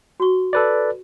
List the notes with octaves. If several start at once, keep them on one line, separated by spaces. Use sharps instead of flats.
F#4 C#6
A4 B4 D5